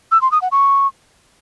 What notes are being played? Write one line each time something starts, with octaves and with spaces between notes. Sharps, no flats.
E6
C6
D#6
F#5
C#6